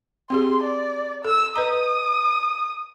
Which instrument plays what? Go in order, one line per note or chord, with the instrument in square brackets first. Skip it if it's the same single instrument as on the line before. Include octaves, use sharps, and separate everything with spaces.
[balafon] C4 G4 G#4 [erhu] C6
[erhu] D5
[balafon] A4 [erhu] E6
[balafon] B4 D#5 A#5 [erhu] D#6